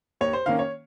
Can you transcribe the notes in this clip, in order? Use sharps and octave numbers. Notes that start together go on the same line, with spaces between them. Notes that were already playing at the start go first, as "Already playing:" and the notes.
D#2 C#5
C5
D#3 A#3 C#4 F5
C#5